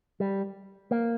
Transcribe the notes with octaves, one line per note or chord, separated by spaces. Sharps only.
G3
A#3